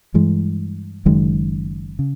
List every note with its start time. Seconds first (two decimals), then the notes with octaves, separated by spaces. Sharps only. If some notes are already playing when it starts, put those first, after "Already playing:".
0.14 G2 E3 G#3
1.05 F#1 F#2 D#3 G#3
1.99 C#3